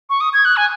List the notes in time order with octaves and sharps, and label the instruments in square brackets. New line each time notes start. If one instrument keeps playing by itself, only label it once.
[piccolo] C#6
D#6
G#6
F#6
G#5